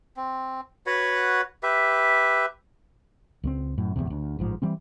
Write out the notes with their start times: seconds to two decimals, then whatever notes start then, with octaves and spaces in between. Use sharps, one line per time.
0.17 C4
0.86 F#4 B4 C#5 F#5
1.63 G4 B4 E5
3.44 C#2 G#3 C4
3.77 F#2 A2
3.96 D1 G#1 E2 C3
4.10 D2
4.39 A1 G#2 F3
4.62 E3 G3 C4